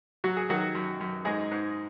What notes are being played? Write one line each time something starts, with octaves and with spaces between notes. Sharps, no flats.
F#3 F#4
G#4
D#3 F#3 F#4
F#2
F#2
G#2 G#3 G#4
G#2